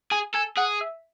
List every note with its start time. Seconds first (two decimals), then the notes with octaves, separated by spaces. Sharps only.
0.11 G#4 G#5
0.34 A4 G#5
0.57 G#4 F#5
0.81 E5